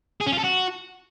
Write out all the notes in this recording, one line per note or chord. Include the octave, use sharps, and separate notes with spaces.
G#4
C#4
F4
A4
F#4